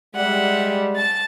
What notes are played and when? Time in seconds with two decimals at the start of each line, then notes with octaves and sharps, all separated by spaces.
0.15 G3 G#3 E5 F#5
0.95 A5 A6